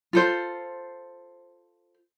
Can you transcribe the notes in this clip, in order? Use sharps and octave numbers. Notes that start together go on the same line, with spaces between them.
F4 A4 C5